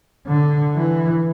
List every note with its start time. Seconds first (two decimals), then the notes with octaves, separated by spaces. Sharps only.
0.27 D3
0.75 E3